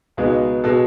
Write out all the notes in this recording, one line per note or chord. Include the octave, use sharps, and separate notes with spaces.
C#2 B2 G#3 B3 D#4
B2 G#3 A4